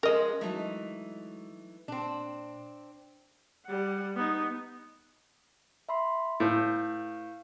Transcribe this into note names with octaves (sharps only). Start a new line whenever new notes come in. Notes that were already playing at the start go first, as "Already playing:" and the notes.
F3 G#3 C#4 A#4 D#5
E3 F#3 G#3 A3 D#4
A#2 C4 D4
G3 F#5
B3 D#4
E5 B5 C6
A2 B4 F5 G6